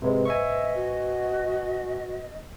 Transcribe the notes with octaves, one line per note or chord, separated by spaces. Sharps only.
G#2 C3 G#3 B4 C5
D#5 E5 G#5 C#6
F#4